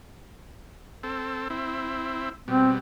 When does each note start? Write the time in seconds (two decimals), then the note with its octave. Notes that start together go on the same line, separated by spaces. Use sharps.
1.03 C4 A4
1.50 C4 E4
2.48 B2 G3 C4